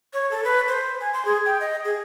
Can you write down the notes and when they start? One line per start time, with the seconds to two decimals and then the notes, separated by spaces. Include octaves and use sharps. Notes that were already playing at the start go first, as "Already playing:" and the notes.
0.13 C#5
0.31 A4
0.44 B4
0.68 C5
1.01 G#5
1.13 C6
1.25 G#4
1.46 G5
1.61 D#5
1.85 G#4